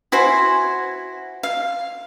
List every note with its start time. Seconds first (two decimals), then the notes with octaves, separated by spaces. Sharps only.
0.12 E4 F#4 C5 G#5
1.43 F5